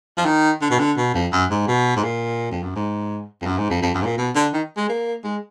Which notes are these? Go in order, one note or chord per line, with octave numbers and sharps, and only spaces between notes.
F3
D#3
D3
B2
D3
B2
F2
F#2
G#2
B2
G#2
A#2
F2
F#2
G#2
F2
F#2
G#2
F2
F2
F#2
G#2
A#2
B2
D3
D#3
G#3
A#3
G#3